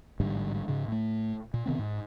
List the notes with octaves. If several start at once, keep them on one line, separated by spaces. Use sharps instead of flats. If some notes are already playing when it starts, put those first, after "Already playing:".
A1 G#2 D3 G3
G#2 C#3
A2 A3
A#2
C3 D#3 B3 C4
G#2